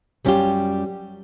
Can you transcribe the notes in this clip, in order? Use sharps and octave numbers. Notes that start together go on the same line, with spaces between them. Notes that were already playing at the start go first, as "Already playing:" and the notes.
F#2 G3 C#4 D#4 F4 G4